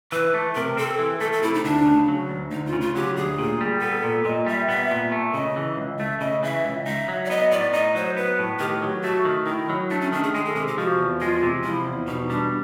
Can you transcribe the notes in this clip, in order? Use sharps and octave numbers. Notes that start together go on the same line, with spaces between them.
E3 B4
A3
C3 A#4
C4 A4
E3
A3 A4
A4
C3 E4
D#4
D2 D4
C#3
F#3
D2
D2 D#4
F4
C#3
F4
F#3 G4
D2 G#4
A#2
G3
B3 A4
A#2
A#2 D#5
G3 E5
B3 E5
A#2
A3
C#3 D#5
E3
C#2
A3 E5
C#3 D#5
E3 E5
C#2
D#4 E5
F#3
D5
B3 D#5
A2 D5
D#4 D#5
F#3 C5
B3 B4
A2
D#3 G4
F#3
A3 F#4
D#3
D#3 E4
F#3
A3 D4
C#4
D#3 D4
G#4
G#3 G#4
A4
C3 G#4
G4
F3 F#4
E2
G#3 F4
C3
F3 E4
E2
B2 D#4
G3 D4